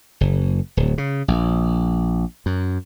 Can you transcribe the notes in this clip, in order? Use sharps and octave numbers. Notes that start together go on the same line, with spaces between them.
F#1
D1
C#3
A#1
F#2